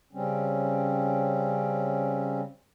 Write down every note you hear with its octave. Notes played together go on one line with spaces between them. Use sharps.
C#3 G3 C4 C#4